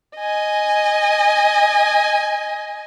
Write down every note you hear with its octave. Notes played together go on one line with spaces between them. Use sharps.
D#5 G#5